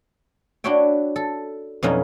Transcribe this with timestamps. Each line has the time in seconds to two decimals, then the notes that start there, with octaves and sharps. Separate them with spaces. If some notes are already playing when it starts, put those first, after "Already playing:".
0.64 D4 E4 F#4 C#5 E5 G5
1.16 A4
1.83 F2 B2 F#3 C#4 D#4 E4